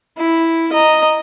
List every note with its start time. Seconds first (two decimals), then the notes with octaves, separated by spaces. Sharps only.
0.17 E4
0.73 D#5 A#5